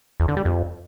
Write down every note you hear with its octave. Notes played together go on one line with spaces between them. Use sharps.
E2
D3
G3
F2